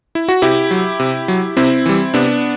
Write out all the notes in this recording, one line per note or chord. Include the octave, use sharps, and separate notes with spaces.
E4
F#4
C3 E4 G4
F#3
C3
F#3
C3 C4 E4
E3 G3
C3 B3 D4